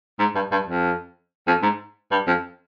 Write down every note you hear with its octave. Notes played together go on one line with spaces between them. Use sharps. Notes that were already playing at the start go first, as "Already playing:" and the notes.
G#2
G2
G2
F2
F2
G#2
G2
F2